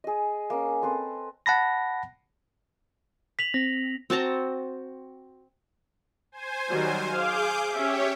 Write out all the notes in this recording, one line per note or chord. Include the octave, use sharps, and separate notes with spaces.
G#4 D#5
A#3 C#4
C4 A4 B4 C5
F#5 A5 B5 A#6
B6 F7 F#7
C4 A#6
C4 F#4 A5 A#5
C5 G#5
D#3 F#3 G3
G#4 F5 D6 G6
C#4 G4 C#5 E5